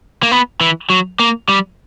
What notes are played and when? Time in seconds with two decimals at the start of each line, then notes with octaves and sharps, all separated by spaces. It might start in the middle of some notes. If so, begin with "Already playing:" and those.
0.23 A#3
0.31 B3
0.61 E3
0.90 F#3
1.19 A#3
1.49 G3